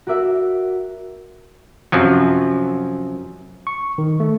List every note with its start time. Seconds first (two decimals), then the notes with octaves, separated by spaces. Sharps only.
0.07 F#4 A#4 D5 E5
1.92 F#2 C3 F3 F#3
3.67 C#6
3.98 D#3
4.20 A3